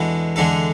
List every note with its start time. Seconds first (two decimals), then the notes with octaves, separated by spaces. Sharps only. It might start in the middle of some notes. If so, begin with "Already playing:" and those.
Already playing: E2 B2 G#3 D4 A4
0.36 E2 D3 G#3 D4 A4